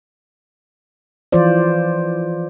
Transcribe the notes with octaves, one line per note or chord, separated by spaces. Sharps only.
E3 F3 F4 C5 D5